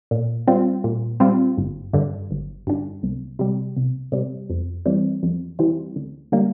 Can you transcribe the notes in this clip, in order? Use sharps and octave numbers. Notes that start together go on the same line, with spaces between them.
A#2
G3 C4 F4
A#2
G3 C4 F4
G1
G2 D3
G1
G2 D3
C2
C3 G3
C2
C3 G3
F2
E3 G3 C4
F2
E3 G3 C4
D2
D3 G3 A#3